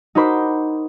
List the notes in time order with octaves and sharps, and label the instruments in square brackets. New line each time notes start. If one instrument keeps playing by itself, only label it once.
[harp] D#4 F#4 A#4 C5 B5 D6